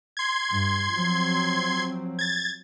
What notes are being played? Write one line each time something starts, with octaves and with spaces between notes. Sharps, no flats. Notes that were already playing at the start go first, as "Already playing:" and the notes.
C6 G#6
G2
F3 F#3 C4
G#6 A6